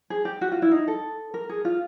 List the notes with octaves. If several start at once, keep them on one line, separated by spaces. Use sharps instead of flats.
G#4
G4
F#4
F4
E4
D#4
A4
A#4
G#4
F4